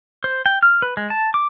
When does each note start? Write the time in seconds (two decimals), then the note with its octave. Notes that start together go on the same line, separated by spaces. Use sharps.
0.24 C5
0.46 G5
0.63 F6
0.82 B4
0.97 G#3
1.10 A5
1.34 D6